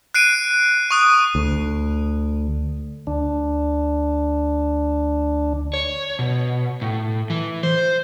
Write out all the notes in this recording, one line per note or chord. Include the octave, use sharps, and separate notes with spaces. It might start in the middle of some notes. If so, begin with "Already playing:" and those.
F#6 C7 D7 D#7
C#6 D#6 F#6
D2
D2 D4
C#5
B2
A2
E3
C5